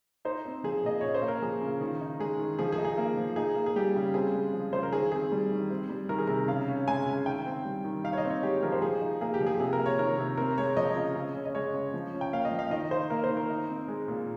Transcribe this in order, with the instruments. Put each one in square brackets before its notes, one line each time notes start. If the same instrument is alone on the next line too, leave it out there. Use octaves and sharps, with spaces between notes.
[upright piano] D#4 C5
C4
F3 G#4
A#2 D#5
C#4 C#5
C5
A#3
A#4
F3 G#4
C#3
D#3
D#4
G#3 G#4
D#3
F3 G#4
G#4
D#4
G#4
A#3
F3
D#4 G#4
A#3
G#4
G3 G4
C#3
C4 G#4
G#3
F3
C#3 C5
A#4
D#3 G#4
C4 G#4
G3
D#3
C4
G3
D#3 A#4
G#4
C3 A#4
C#3 F5
C#4
G#3 G#5
C#3
D#3 G5
C4
G3
D#3
D#4 F5
C#5
D#5
C4
C#5
G#3 G4
F3 A#4
C5
F3 G#4
D#4
A#3 G#4
G4
F3
G#4
C3 G#4
A#4
A#3
C#5
D#3 A#4
C3
C4 A#4
G#3 C#5
F3 D#5
C#3
C#3
C#4
D#5
G#3 C#5
C#3
F3
C#4
G5
A#3 F5
D#5
F3
F5
D#3 D#5
D#4 C5
A#3 A#4
C5
D#3
A#4
D#4
C4
G#3
A#2